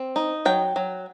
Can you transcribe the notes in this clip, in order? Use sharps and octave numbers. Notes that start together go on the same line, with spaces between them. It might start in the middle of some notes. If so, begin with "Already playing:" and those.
Already playing: C4
D#4
F#3 G5
F#3